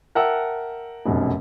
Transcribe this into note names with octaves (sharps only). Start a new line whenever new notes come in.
A#4 E5 F#5 G5 A5 E6
F1 B1 F#2 B2